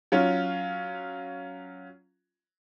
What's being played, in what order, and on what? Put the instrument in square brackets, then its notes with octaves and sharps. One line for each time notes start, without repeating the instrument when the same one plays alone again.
[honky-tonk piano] F#3 C#4 F4